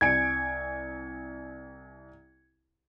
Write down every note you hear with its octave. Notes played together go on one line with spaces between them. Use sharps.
C2 G#5 G#6 C#7 D7